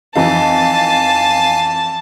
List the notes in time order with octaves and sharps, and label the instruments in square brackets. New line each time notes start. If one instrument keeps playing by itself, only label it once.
[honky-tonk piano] F2 E3 D#4 [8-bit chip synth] F5 G#5 [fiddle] A5